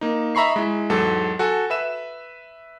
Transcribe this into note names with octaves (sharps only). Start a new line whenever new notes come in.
A#3 D#4
D#5 E5 A#5 B5 C#6 C7
G#3 E4
E2 G#2 F#3 A4
F#4 A4 G#5
B4 E5 E7